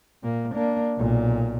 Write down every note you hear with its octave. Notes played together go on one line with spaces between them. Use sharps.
A#2 A#3
A#3 D4
B1 A#2